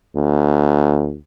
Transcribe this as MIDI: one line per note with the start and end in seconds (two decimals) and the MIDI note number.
0.16 1.17 38